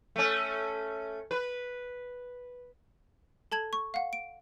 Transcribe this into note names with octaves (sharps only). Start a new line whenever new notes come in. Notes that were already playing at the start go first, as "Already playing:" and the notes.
A3 C#4
B4
A4 A5 G#6 F#7
C#6
F5 F#5
D7